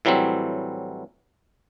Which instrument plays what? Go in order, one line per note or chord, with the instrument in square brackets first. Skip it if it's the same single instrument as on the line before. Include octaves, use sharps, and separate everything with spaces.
[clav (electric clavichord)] A2 E3 F#3 G3 C4